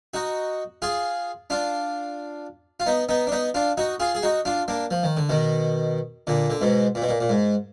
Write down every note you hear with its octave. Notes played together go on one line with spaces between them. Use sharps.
D#4 F#4
F4 G#4
D4 F4
F4
B3 D#4
B3 D#4
D4
B3 D#4
D4 F4
D#4 F#4
F4 G#4
G#4
D#4 F#4
D4 F4
A#3 D4
F3
D#3
D3
B2 D#3
A#2 D3
D3
G#2 B2
A#2
B2
A#2
A#2
G#2